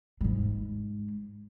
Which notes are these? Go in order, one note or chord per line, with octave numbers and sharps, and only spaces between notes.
G#2 G#3